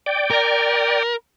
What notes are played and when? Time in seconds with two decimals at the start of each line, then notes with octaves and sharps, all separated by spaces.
0.06 D5 G5
0.30 A#4